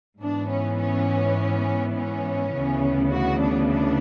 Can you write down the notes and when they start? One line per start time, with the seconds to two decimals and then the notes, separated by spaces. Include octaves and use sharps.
0.20 G#2 E3 B3 D4
0.49 C#4
0.79 C#4
1.95 C#4
2.52 D2 C#3 E3 B3
3.11 F#4
3.40 D4
3.69 D4